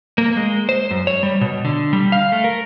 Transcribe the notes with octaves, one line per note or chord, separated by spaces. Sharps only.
A#3
G#3
C5
F#2
C#5
G3
B2
D3
G3
F5
A3
A#4